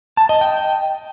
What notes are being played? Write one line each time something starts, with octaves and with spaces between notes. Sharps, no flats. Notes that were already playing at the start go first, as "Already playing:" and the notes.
A5
D#5
G5